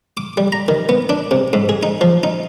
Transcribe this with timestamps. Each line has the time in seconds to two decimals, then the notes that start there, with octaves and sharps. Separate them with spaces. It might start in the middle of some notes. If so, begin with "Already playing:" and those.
0.17 D6
0.37 G3
0.52 A#5
0.68 D#3
0.89 B3
1.09 D4
1.31 C3
1.53 G#2
1.69 G#4
1.83 D#4
2.01 F3
2.23 D#4